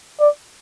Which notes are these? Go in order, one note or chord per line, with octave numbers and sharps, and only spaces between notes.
D5